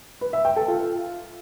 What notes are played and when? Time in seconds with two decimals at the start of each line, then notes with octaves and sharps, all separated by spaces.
0.21 B4
0.33 E5
0.45 G5
0.56 A4
0.68 F4